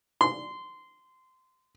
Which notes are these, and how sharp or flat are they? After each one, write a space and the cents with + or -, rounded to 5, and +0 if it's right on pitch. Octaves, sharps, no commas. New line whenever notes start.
C6 -20